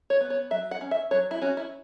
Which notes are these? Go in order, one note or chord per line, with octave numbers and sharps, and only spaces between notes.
C#5
B3
C#5
F#3 E5
F#5
C#4
E5
F#3 C#5
E4
C#4 F#4
E4